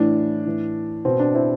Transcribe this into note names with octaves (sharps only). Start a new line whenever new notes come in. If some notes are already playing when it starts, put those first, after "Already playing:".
Already playing: A2 E3 D4
A2 E3
B2 C4
D4
C4 E4